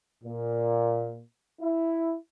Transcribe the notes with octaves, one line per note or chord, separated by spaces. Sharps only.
A#2
E4